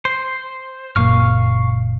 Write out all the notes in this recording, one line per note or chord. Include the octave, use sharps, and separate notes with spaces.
C5
F#1 A#2 F5 C#6 F6